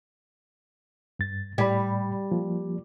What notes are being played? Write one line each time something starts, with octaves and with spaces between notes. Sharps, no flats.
G2 A6
A2 G3 D5 B5
F3 A#3